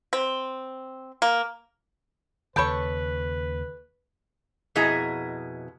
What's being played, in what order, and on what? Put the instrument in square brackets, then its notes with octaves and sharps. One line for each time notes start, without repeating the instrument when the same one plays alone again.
[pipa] C4
A#3
[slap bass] D#2 C#3 [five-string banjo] A4 C#5 [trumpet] B4 [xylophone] B5 G6 D7
[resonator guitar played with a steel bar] F2 B2 E4 G#4 D#5 A#5